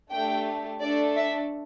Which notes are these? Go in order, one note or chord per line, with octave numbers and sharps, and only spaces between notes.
A3 D4 G4 G5
A3 D4 A4 D5
E5